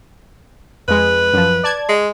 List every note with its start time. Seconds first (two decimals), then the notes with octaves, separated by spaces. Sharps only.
0.88 F2 G#3 B4
1.33 F#2 F3
1.64 D5 A5 G#6
1.89 G#3